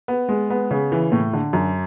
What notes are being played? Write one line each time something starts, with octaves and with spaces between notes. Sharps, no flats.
B3
G#3
B3
C#3
E3
A2
D3
F#2